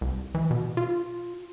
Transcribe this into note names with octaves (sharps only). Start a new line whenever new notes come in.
C2
E3
B2
F4